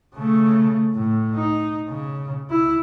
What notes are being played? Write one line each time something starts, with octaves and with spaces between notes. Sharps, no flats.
C#3 A3
A2
D#4
C#3
E4